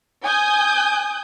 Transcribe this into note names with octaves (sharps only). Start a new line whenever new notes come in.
G#5 D#6 G6